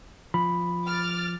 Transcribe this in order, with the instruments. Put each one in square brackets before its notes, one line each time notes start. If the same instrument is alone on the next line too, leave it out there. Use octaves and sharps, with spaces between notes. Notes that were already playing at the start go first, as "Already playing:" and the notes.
[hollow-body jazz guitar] F3 [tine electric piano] B5
[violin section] D6 F6 A6